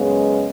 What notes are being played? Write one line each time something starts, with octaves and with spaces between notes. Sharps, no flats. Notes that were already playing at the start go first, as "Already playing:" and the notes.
Already playing: F#2 C#3 G#3 B3